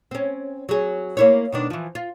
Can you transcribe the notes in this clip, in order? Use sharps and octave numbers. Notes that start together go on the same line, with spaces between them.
C4 C#4
F#3 G#4
A#3 E4 C#5
B2 D#3 D4
E3 F3
F4